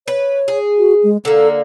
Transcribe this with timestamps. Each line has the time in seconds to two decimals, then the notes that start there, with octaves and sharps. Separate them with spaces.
0.08 B4 C#5
0.48 G#4
0.78 F#4
1.03 G#3
1.25 D3 A#3 A4